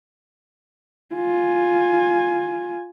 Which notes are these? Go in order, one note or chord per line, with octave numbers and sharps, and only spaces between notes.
F4 G#5